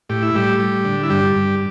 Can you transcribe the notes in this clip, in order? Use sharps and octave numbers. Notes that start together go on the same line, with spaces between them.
A2 G4
E4
A2 G3 G4
G3
D3
E4
G2 G3 G4
G2